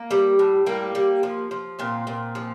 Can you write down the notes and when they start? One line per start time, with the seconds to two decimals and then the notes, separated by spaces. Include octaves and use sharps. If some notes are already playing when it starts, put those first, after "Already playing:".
Already playing: A#3
0.11 G3
0.39 A2
0.66 G3 A#3
0.95 G3
1.23 F3
1.51 F3
1.79 A#2 C4
2.07 A#2
2.35 F3